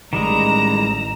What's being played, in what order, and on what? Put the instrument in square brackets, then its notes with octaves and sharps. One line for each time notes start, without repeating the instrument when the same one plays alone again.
[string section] A1 A#5 [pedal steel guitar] D#3 G3 G#3 [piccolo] E7